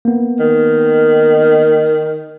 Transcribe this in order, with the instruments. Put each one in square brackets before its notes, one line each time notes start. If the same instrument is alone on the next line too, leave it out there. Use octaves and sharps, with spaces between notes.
[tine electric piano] A#3 B3
[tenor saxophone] D#3